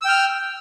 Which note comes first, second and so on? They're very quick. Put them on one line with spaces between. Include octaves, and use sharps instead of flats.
E6 G5 F6